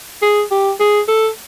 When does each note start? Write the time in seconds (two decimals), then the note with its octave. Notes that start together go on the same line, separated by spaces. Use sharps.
0.22 G#4
0.51 G4
0.80 G#4
1.08 A4